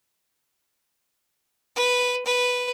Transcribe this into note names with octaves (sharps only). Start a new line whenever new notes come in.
B4
B4